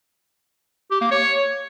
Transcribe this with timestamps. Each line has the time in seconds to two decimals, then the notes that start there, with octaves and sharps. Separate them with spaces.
0.91 G4
1.01 A#3
1.11 C#5